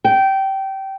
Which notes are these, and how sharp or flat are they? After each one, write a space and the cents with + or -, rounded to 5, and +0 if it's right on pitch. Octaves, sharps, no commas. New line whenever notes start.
G5 -20